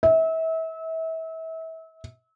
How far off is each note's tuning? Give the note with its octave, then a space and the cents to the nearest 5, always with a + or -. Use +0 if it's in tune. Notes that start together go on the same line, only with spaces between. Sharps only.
E5 -30